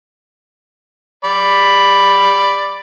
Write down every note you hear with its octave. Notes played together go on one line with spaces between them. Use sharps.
D5 B5